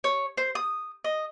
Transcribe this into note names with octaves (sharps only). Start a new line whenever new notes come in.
C#5
C5
D#6
D#5